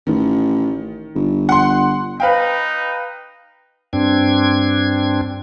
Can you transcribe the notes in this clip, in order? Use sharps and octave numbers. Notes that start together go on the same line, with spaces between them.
A1 D#3
G1
F#5 C6
D#4 B4 F5 G5
G2 C4 D4 G#6